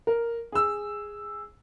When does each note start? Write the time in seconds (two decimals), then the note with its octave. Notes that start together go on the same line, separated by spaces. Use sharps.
0.07 A#4
0.52 G#4 E6